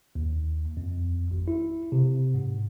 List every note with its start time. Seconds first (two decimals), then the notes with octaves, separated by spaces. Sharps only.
0.15 D#2
0.77 F2
1.31 G#1
1.48 E4
1.92 C3
2.34 G#2